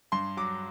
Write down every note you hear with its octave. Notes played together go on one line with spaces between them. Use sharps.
G2 C6
F#3 D6